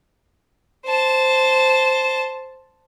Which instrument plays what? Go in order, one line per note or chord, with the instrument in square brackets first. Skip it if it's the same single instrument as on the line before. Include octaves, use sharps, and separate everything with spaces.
[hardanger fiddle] C5 A5